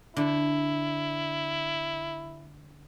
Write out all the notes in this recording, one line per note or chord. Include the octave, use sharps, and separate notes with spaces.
D3 E4